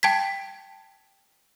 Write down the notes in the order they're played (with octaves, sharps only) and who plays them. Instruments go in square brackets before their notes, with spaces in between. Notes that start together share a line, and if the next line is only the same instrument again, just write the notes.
[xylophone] G5 A5 G#6 B6